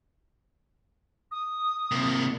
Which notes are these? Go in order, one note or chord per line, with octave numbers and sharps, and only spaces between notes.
D#6
C3 A#3